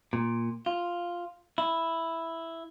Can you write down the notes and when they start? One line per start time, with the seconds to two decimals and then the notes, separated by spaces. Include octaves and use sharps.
0.13 A#2
0.66 F4
1.58 E4